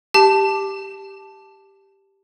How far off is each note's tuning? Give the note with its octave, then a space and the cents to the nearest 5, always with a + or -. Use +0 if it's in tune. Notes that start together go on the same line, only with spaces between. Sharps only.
G4 +0 A5 +0